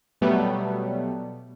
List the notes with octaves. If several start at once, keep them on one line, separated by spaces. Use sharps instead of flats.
B2 F#3 G3 A3 B3